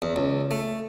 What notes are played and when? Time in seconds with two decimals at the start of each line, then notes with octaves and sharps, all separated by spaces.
0.02 E2
0.16 C#2
0.51 A3